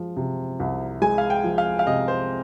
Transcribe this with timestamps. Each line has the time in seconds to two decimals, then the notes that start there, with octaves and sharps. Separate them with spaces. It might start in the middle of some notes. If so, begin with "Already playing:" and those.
Already playing: F3 G#3
0.17 C3
0.60 C2
1.02 G#3 G#5
1.18 F5
1.30 G5
1.44 F3
1.58 F5
1.79 F5
1.87 C3 D#5
2.08 C5